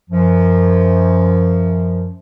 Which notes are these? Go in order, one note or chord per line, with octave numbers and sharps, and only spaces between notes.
F#2 F3